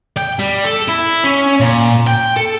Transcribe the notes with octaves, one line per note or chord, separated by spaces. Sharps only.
G5
G3
A4
E4
C#4
A#2
G5
A4